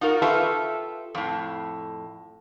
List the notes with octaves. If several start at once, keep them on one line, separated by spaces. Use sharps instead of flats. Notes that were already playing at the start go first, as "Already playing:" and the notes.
D#4 F4 F#4 A#4
F4 G4 A4 B4 E5
F2 A2